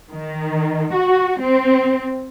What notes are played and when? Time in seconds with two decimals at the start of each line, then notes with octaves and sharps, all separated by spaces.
0.11 D#3
0.94 F#4
1.41 C4